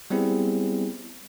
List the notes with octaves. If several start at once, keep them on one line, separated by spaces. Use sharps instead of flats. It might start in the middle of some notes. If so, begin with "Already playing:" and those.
G3 B3 C4 E4 G#4